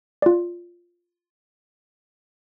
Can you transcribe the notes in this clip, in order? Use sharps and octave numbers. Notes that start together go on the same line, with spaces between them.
F4 D5